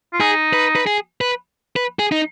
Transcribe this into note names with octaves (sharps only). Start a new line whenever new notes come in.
F4
D#4 G#4
B4
B4
G#4
B4
B4
G#4
D#4